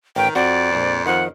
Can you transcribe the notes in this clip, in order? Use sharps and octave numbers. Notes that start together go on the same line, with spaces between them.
A1 D#3 G5
F2 C4 F#4 D5
A#1 C5
D#3 F3 F#5